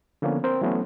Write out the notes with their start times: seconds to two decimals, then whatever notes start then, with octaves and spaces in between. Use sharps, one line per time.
0.22 D3 F3 A#3 B3 C#4
0.44 C4 A#4 C5 G5
0.61 E3 F#3 A3 B3 C#4